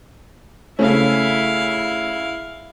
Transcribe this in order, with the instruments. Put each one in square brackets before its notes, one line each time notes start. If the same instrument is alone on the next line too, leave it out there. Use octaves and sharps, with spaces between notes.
[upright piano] C#3 A3 C#4 [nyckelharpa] E4 F5